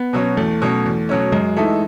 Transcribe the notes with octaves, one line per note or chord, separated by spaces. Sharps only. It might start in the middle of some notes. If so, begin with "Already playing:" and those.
Already playing: B3
B2 F#3 C#4
E2 A3
B2 F#3 C#4
E2
B2 F#3 C#4
F#2 G#3
E3 A3 D#4 A4